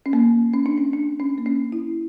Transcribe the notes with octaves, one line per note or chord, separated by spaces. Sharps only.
C#4
A#3
C#4
D4
C#4
D4
C#4
A#3
C#4
E4